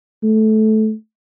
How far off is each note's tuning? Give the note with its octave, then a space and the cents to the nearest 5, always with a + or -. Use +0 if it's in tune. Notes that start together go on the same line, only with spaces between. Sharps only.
A3 -15